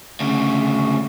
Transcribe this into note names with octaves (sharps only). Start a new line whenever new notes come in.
D2 C#3